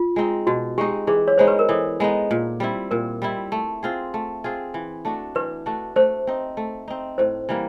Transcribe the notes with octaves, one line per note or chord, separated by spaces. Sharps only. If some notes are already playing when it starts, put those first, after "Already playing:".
Already playing: F4
G#3 C4 D#4
B2 F#4
G#3 C4 D#4 G4
E3 G#4
C#5
G#3 B3 D#4 C5
B4
A#4
E3 A4
G#3 B3 D#4
A#2
G3 C4 E4
A#2 A#4
G3 C4 E4
A3
C4 F4 G#4
A3
C4 F4 G#4
E3
A3 D4 F#4
E3 B4
A3 D4 F#4
A3 C5
C4 D#4
A3
C4 D#4
A2 C5
E3 G3 A#3